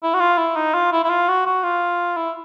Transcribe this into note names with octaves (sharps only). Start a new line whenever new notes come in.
E4
F#4
F4
E4
D#4
F4
E4
E4
F4
F#4
F#4
F4
E4